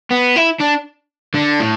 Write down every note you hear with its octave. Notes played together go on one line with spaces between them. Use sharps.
B3
E4
D4
D3
A2